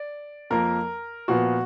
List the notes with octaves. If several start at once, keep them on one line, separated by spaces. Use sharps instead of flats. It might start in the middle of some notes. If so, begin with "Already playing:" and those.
Already playing: D5
F2 F3 A#3 A#4
A#2 F3 B3 F#4